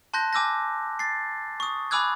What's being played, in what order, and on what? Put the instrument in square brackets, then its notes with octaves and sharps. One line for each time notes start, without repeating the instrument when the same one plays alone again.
[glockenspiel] A5 C6 F#6 G6 A#6
G#5 D6 E6 G6 A#6
A6 C7
C#6 D#6
G#5 B5 D6 E6 F#6 G#6